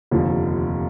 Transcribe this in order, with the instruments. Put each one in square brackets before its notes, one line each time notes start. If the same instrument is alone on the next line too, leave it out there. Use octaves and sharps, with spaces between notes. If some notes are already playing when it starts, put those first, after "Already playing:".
[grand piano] F1 D#2 D3 F3